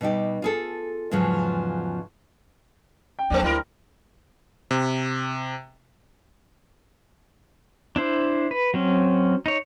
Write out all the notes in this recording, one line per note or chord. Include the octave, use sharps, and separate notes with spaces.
B2 G3 D#4 G4
F4 G#4 A4
E2 G#2 C#3 F3 F#3
G5
D#2 F#3 A3 C4 D4
D2 G2 E4 A#4
C3
D4 E4 C5
B4
F#3 C4 C#4
D#4 C#5